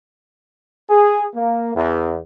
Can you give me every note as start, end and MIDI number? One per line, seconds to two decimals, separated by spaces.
0.90 1.25 68
1.35 1.71 58
1.75 2.18 40